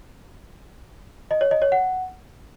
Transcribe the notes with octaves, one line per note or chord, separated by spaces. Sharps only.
D#5
C#5
D#5
C#5
F#5